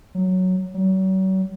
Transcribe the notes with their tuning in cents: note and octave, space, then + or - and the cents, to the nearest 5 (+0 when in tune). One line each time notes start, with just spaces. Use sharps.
F#3 +0
F#3 +40